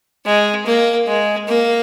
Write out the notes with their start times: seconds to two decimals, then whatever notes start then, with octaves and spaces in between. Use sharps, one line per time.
0.26 G#3
0.66 A#3
1.07 G#3
1.48 A#3